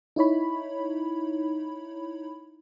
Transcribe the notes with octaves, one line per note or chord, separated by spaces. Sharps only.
D#4 E4 C#5 B5